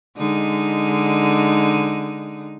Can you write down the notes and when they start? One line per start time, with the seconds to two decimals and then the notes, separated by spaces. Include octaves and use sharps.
0.18 D3 G#3 D#4